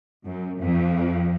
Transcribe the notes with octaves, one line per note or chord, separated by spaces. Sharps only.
F#2
F2